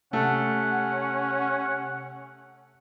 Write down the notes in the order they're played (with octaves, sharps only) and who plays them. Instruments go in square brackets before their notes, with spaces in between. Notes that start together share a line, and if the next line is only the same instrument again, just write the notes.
[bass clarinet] C3 [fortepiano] A3 [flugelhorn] C#4 [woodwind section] F#5